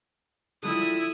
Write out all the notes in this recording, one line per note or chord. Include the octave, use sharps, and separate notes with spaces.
D3 F3 G3 E4 D#6